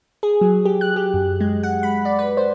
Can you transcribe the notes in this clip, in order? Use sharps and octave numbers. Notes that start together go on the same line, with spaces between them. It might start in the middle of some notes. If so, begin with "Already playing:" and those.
G#4
F#3
G4
F#6
G4
F#2
G#3
F#5
B5
D5
B4
C5